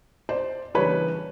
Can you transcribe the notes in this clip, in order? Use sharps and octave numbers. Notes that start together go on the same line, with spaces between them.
C5 D5
C#3 E3 G3 A#3 D4 B4 C#5